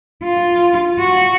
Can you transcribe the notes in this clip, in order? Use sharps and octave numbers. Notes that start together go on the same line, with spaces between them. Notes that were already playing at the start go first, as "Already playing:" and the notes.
F4
F#4